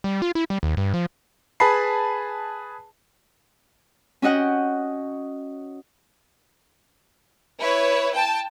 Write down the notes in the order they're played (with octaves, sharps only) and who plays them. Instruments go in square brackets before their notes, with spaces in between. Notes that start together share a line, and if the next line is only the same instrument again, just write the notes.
[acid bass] G3
F4
E4
G3
D#2
G2
F3
[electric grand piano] G#4 B4 G#5 A5 B5 C7
[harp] C#4 F#4 D#5 F#5 G5
[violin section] E4 B4 C#5
G5 A5